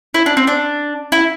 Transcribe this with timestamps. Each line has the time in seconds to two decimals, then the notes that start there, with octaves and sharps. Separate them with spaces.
0.14 E4
0.26 D4
0.37 C4
0.47 D4
1.12 E4